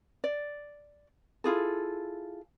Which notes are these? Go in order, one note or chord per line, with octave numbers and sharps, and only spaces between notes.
D5
E4 F4 G#4 A4